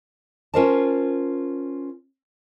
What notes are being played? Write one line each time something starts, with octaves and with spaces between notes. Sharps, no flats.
C#4 F4 A#4 C5 D#5 A5